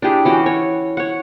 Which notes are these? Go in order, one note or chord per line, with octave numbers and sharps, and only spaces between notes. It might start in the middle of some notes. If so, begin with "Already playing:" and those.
D4 E4 G4 G#4
E3 C#4 F#4 G5
C#5
C#5 F#5